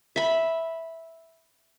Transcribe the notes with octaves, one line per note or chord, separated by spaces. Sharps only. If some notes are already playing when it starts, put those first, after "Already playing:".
E5 B5